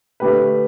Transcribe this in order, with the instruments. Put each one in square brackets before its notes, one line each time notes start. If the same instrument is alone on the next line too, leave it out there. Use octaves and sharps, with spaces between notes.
[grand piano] D3 A3 G4 B4